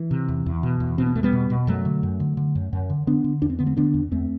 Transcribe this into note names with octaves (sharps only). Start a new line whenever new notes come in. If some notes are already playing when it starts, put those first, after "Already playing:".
Already playing: E3
C3
E2
E2
B2
E2
B2 C4
B3
E2 A3
G3 B3
B2
B2
F#2 F#3 A3
D3
F#2
D3
D3
F#2
F#2
D3
D3 B3 D4
D3
E2 D4
C4
D3 B3
A3 C4
D3 B3 D4
E2
E2 A3 C4